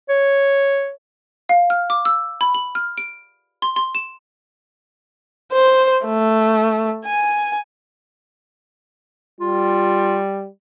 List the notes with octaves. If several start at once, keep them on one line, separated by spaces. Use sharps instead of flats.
C#5
F5
F6
D6
E6
B5
F#7
F6
D7
C6
C6
E7
C5
A3
G#5
G3 F4